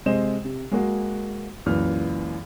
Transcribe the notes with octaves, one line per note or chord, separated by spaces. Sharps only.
C3 G#3 C5 D#5 E7
C3
G#3 A#3 F#4
C#2 F#2 A#2 E3 F6